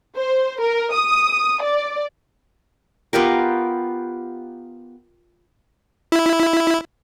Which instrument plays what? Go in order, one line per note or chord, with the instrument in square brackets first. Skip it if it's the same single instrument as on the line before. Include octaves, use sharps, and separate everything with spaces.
[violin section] C5
A#4
D#6
D5
[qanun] B3 F4 G4 A#4
[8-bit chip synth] E4